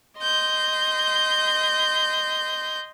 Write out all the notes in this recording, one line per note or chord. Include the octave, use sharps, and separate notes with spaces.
D#5 C6 G6